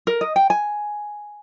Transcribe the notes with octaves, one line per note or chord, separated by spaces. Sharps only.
A#4
D#5
G5
G#5